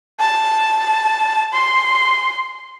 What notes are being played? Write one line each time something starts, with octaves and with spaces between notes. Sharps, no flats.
A5
C6